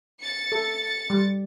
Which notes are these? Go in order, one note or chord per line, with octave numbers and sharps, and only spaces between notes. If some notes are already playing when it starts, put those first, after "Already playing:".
A6 C#7
A4
G3